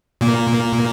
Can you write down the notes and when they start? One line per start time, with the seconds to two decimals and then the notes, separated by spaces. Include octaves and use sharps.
0.21 A#2 A#3